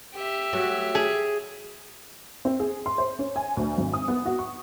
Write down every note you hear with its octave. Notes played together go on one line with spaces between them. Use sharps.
G4 E5
F#3 A3
G#4
C4
G#4
C6
C5
C#4
G#5
D2
G#1
D#6
B3
F#4
C#6